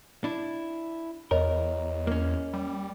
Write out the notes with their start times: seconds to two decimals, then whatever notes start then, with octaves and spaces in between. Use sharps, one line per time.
0.24 D4 E4
1.31 E2 A#4 C#5 D#5
2.07 A#3 C#4
2.53 G3